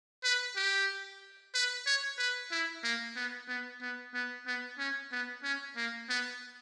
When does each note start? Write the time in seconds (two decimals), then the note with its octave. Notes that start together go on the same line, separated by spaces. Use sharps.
0.24 B4
0.56 G4
1.54 B4
1.86 C#5
2.18 B4
2.52 E4
2.84 A#3
3.16 B3
3.48 B3
3.81 B3
4.14 B3
4.47 B3
4.78 C#4
5.12 B3
5.43 C#4
5.76 A#3
6.09 B3